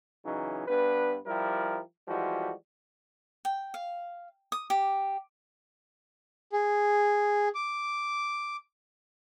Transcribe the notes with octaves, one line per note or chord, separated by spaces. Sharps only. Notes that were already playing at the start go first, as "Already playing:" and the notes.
C#3 E3 F#3 D#4
G2 B3 D4 B4
F3 G3 E4 G4 A#4
E3 F3 G3 G#3 F#4
G5
F5
D#6
G4
G#4
D6